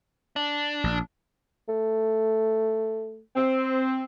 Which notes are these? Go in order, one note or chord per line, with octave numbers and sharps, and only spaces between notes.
D4
A#1
A3
C4